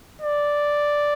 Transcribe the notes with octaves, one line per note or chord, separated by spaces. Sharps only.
D5